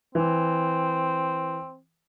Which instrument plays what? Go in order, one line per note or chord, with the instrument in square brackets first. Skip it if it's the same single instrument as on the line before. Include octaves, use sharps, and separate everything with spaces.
[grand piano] E3 [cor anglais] C4